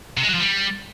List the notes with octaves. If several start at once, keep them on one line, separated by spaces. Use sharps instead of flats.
C3
G#3
F#3
F3
G3